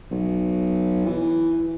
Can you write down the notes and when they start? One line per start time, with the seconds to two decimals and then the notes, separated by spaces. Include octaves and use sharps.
0.11 B1
1.06 E3